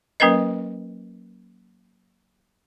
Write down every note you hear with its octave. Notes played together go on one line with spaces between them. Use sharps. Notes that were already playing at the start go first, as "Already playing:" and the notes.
F#3 A#3 C#4 A#4 B4 D#5